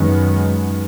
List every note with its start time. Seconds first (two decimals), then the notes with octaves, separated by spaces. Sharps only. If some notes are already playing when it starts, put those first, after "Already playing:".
Already playing: F#2 D#3 G#3 B3